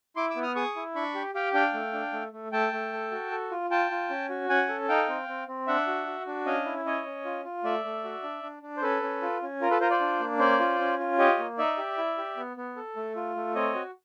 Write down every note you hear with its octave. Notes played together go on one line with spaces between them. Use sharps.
E4 C6 D6
D6 E6
B3
D#6 F6
G#4 C#6 D#6
E4
D4 B5 C#6
G4
G4 F5 G5
D4 F5 G5
A3
D4
A3
A3
A3 G5 A5
A3
A4
F#4
A4
F4
F4 G5 A5
F4
C#4
F#4
C#4 F#5 G#5
A4
D#4 F5 G5
C4
C4
C4
D4 E5 F#5
F#4
F#4
D4
C#4 D#5 F5
E4
C#4 C#5 D#5
C#4
F4
F4
A3 D5 E5
A3
F#4
D4
D4
D4
C5
C#4 A4 B4
C#4
F4
C#4
F4 A#4
A4 B4
F4 A#4 C5
C5 D5
D4
A#3
C#4 C5 D5
F4
C#4
F4
G4 C#5 D#5
A#3
D#4 D5 E5
G4
E4
G4
B3
B3
A4
A3
F4
A3
C4 C#5 D#5
F#4